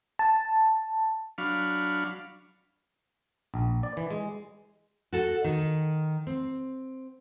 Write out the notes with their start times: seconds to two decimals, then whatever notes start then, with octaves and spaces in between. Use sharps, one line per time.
0.19 A5
1.38 F#3 D4 F5 B5 C#6 F6
3.54 A#1
3.83 D5
3.97 E3
4.11 G#3
5.12 F#4 A4
5.44 D#3
6.27 C4